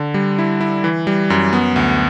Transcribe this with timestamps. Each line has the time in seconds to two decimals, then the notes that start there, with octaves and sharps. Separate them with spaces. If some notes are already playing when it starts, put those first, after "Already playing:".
Already playing: D3
0.14 G3
0.39 E4
0.61 E4
0.84 E3
1.07 G3
1.30 F#2
1.53 B3
1.76 D2